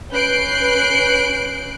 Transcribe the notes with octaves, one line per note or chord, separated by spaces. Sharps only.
C#4 B4 F#6 G6 C7 D7